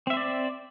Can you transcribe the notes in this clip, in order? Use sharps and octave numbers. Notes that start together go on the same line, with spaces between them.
C4 C5 D5 E5